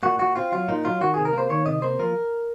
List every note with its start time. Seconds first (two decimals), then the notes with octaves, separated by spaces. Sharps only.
0.03 A#2 F#4
0.19 A#2 F#4
0.36 C4 F4
0.52 F#3 F4
0.68 A#2 D#4
0.85 F#3 F4
1.01 D#3 F#4
1.14 C3 G#4
1.25 A#4
1.33 A#3 C5
1.50 D#3 C#5
1.66 C3 D#5
1.82 A#3 C5
1.99 F3 A#4